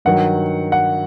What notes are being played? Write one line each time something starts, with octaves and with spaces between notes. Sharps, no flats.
G2 D#3 F#3 F#5
F#5